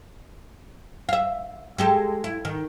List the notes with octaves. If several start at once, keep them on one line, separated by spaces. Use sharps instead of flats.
E5 F5
G#3 G4 A4
E4
D#3